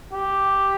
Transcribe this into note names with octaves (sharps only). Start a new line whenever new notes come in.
G4